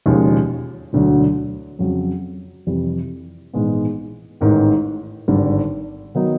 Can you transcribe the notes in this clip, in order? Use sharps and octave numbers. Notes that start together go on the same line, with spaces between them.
E1 D#2 C#3 F3 G#3
E1 D2 D3 F#3
F2 C#3 F#3
F2 C3 E3 G3
A#1 G#2 E3 G#3 B3
A1 G#2 D#3
G#1 G2 D3 G3
D#3 F#3 B3 D#4